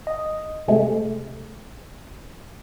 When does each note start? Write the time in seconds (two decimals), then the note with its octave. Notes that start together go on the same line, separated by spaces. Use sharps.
0.07 D#5
0.68 C3 G#3 A3